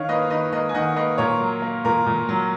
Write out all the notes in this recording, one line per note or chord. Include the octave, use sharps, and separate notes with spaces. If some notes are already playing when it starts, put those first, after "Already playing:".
Already playing: D#3 C#5 F5
A#3 B4 D#5
D#3 B4 D#5
A#3 B4 D#5
G#5
D#3 D#5 F#5
A#3 B4 D#5
A#2 A#4 C#5
F#3
A#3
A#2 A#4
A#2
F#3